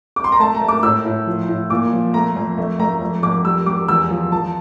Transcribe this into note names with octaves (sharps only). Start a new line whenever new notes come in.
D6
C6
A#5
A3 A5
A#5
A3
D6
A2 E6
A2
F3
A2
A#2 D6
F3
A3 A#5
F2
A3
A3 A#5
F2
F2 D6
G3 E6
G3 D6
E2 E6
F3
F3 A5